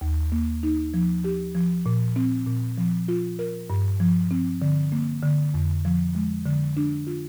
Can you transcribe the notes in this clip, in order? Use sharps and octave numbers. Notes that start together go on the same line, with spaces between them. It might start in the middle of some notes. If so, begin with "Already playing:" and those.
D#2
A#3
D#4
F3
G4
F3
A#2
C4
A#2
F3
F4
A#4
G2
F3
C4
D3
A#3
D3
F2
F3
G#3
D3
D4
F4